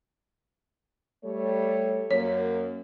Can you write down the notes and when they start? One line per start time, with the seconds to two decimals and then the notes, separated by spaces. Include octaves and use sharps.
1.25 G3 A3 C#5
2.11 F#2 F#3 A#3 C#5